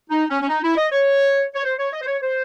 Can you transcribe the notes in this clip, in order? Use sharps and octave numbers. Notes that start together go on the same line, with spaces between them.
D#4
C#4
C#4
D#4
E4
D#5
C#5
C#5
C5
C#5
D#5
C5
C#5
C5